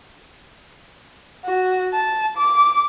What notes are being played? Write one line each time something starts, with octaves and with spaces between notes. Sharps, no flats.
F#4
A5
D6